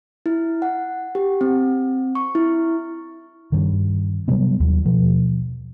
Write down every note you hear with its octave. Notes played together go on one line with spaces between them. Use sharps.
E4
F#5
G4
C4
C#6
E4
G2 D#3
C3 F#3 G3 B3
D#2 F#3
B2 F3